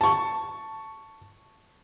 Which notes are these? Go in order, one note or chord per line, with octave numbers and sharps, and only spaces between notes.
A5 C#6